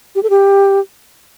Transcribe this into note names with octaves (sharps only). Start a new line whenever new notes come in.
G4
A4
G4